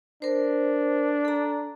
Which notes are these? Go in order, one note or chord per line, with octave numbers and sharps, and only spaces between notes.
D4 A#4 C5
A4 A#5